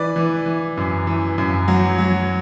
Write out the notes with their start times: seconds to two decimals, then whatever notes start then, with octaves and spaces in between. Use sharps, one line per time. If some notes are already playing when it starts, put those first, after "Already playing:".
Already playing: E3 B4 D5
0.16 E3
0.46 E3
0.77 F#2
1.07 E3
1.38 F#2
1.68 F#3
1.98 F#3